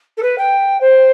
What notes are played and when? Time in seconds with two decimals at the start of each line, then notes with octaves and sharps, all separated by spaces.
0.17 A4
0.22 B4
0.37 G5
0.80 C5